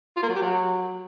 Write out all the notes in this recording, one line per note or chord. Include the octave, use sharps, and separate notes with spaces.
F4
A#3
F#3
G4
F#3